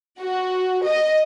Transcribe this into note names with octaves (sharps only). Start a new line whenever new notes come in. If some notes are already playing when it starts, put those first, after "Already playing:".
F#4
D#5